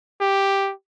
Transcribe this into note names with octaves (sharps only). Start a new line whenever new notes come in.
G4